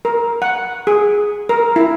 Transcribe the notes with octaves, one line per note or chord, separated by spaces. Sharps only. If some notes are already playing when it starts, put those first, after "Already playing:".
A#4
F#5
G#4
A#4
E4